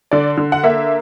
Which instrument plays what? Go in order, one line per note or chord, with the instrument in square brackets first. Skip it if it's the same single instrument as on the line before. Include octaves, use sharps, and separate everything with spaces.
[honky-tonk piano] D3 D5
D3
F#5
A#3 E5